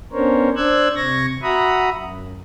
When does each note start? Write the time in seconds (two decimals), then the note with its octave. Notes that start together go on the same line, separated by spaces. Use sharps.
0.13 B3 C#4 D4 A#4 C5 C#5
0.56 D4 C5 D5 E6 F#6 G#6
0.96 C3 C#6 G#6 A#6
1.42 F#4 E5 F#5 A#5 B5 D#6
1.92 F#2